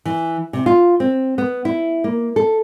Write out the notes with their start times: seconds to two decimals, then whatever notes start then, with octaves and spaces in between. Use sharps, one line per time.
0.05 E3
0.53 C3
0.66 F4
1.00 C4
1.38 B3
1.65 E4
2.04 A#3
2.36 A4